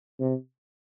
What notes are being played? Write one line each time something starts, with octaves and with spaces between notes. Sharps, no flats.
C3